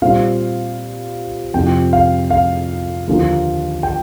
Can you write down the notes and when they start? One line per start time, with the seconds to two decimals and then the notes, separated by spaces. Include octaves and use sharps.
0.02 A#2 G3 C4 F5
1.54 F2 C3 F3 G5
1.93 F5
2.30 F5
3.07 D#2 D3 F3 A#3
3.83 G5